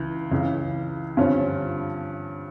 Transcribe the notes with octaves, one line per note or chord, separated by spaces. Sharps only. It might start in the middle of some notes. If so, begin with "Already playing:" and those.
Already playing: C#2 E3
C#2 C#3 E3
G2 D3 F3 C#4 F4